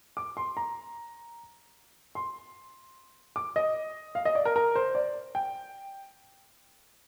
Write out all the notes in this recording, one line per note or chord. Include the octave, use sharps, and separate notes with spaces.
D6
C6
A#5
C6
D6
D#5
F5
D#5
D5
A#4
A#4
C5
D5
G5